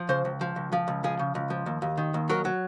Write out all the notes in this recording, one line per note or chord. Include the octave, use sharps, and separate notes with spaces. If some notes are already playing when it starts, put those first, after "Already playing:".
Already playing: F3
C#3 C5
C#2
F3
C#2
F3
C#2
F3 G#4
C#3
C#2
F3
D#2
D#2
D#3
D#2
F#3 A#4
F#3